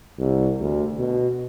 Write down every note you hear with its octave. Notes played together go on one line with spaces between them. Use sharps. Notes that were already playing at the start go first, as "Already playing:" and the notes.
C2
D2
B2